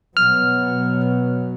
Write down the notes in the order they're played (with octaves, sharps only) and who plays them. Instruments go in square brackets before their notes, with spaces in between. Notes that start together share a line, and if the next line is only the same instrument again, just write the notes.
[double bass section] B2 F#3 B3 [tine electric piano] F6